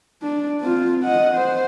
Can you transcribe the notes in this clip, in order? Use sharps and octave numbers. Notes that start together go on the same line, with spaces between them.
D4
C4 F4
D#5 F#5
C5